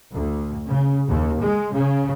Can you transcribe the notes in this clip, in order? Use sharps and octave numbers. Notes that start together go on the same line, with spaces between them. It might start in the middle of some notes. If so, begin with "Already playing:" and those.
D2
C#3
D#2
G#3
C#3